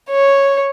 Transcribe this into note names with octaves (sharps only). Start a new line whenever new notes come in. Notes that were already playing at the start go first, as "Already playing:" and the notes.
C#5